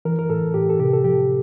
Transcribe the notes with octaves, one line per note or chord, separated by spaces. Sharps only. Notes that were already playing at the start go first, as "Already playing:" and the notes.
E3 A#4
A#4
A2 A4
A2 G4
A4
C3 G4
A4
F3 G4